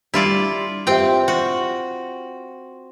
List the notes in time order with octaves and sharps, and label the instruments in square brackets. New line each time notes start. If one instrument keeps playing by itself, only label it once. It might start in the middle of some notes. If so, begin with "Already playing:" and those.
[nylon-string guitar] G3 D4 [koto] E4 F4 D5
[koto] C4 G5 [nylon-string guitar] F4 G4 E5
[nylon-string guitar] F4 [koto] F#4